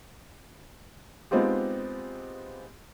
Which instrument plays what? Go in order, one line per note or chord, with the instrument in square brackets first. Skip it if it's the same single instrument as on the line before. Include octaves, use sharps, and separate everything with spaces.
[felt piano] G#3 B3 C4 D#4 F4 G4